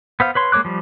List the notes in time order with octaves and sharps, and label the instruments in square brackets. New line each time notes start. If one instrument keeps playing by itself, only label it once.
[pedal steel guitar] B3 C5 F5
B4 C#5 C6
G#3 A#3 C#5 D6 F#6
F3 G3